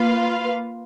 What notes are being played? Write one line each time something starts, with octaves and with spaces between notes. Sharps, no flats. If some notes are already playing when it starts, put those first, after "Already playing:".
Already playing: A#3 F4 B4 F5